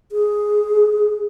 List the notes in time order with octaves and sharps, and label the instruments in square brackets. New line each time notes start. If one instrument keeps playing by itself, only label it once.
[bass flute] G#4